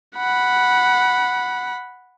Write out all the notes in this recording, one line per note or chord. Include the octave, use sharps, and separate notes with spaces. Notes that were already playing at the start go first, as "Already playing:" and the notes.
F#5 B5